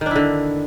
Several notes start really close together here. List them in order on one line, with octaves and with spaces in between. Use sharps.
D#3 D4 E4 D3